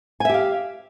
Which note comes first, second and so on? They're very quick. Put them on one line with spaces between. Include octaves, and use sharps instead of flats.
G#5 E5 G4 F5